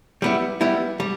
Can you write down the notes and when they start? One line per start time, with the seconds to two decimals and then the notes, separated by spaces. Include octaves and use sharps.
0.22 G3 B3 E4
0.61 G3 B3 E4
1.00 G3